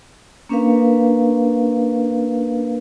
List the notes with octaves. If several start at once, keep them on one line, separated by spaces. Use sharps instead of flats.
A#3 C#4 D4 A#4 B4 F5